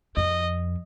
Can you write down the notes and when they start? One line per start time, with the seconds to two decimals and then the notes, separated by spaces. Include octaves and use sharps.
0.16 F2 D#5